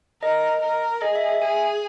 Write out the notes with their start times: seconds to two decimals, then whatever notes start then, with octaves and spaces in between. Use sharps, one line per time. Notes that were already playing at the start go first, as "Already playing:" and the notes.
0.22 A#4 D#5
0.62 A#4
1.02 G#4 D#5
1.15 E5
1.29 E5
1.42 G#4 G#5